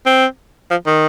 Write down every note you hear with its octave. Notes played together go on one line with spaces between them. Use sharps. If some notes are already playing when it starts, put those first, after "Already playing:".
C4
F3
D#3